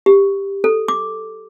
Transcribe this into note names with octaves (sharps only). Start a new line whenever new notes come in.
G4
A4
D6